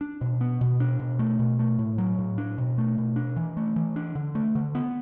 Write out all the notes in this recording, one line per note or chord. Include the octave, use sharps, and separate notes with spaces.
D4
B2
B3
B2
D4
B2
A3
B2
A3
A2
F#3
A2
D4
B2
A3
B2
D4
E3
A3
E3
D4
D3
A3
D3
B3